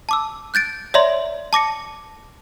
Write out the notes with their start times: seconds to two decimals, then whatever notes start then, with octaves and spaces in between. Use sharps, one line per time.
0.09 A5 D6 E6
0.54 F#6 G6 A6 D7
0.94 C#5 D5 E5 A#5 C6
1.53 A5 D6 A#6 C#7